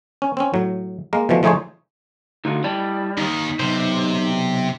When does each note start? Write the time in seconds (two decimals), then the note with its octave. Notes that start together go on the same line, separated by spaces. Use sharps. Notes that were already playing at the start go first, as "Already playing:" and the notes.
0.22 C#4
0.37 C4 C#4
0.54 A2 F#3
1.13 G#3 A#3 A#4
1.29 B2 E3 F3 A3
1.43 F3 A3 D#4 G#4 C5 C#5
2.45 D2 D#4 F4 F#4
2.64 G3 E4 D5 A5
3.17 D#2 D#3 D#4
3.60 B1 C3 C5